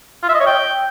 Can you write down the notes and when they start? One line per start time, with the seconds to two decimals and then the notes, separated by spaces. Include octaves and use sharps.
0.23 F4
0.29 E5
0.35 D#5
0.40 C#5
0.46 G5